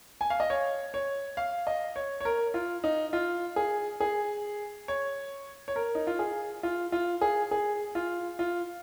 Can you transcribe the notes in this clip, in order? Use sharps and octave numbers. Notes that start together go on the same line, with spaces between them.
G#5
F5
D#5
C#5
C#5
F5
D#5
C#5
C#5
A#4
F4
D#4
F4
G#4
G#4
C#5
C#5
A#4
D#4
F4
G#4
F4
F4
G#4
G#4
F4
F4